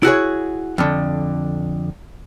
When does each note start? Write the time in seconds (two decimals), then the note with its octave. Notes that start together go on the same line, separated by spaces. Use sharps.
0.03 E4 F#4 G#4 C#5
0.78 F2 D3